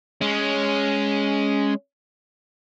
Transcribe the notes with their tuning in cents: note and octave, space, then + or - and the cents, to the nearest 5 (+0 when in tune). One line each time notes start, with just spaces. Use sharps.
G#3 +0 C#4 +5